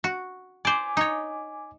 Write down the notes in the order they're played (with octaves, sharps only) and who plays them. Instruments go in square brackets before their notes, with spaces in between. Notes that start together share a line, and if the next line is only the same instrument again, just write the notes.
[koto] F#4
[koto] C5 D5 [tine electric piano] G#5 D6
[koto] D#4 C#5